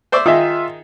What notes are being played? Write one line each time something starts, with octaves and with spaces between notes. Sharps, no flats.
C5 D5 E5
D#3 D#4 F4 G#4 E5